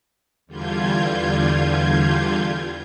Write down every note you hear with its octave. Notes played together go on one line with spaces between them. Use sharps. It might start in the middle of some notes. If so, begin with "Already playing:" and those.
E2 D3 G3 F4 G6 G#6